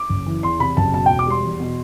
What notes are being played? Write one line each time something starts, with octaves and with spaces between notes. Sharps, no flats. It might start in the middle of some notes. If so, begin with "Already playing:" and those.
Already playing: D6
F#1
E3
E2 C6
C3 B5
F#1 A5
B2 A5
E1 G5
D6
G3 C6
E2
B2